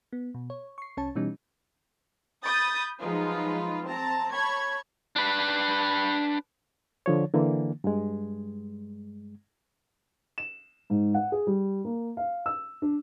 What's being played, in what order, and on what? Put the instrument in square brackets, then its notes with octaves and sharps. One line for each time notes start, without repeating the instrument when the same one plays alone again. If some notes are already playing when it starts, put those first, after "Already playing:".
[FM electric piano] B3
B2
C#5
C#6 C7
C2 C#4 C#5 A5
B2 E3 G3 C#4 D#4
[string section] B5 D#6 G6 A6
F3 F#3 G#3 D#4 F4 B4
C4 A5 A#5
C#5 A5 B5 C#6 G#6
[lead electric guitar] D4 B4
[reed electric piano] D3 F3 C#5
D3 E3 A#3
G2 G#3
[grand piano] E7
G#2
F#5
G#4
G3
A#3
F5
E6
D4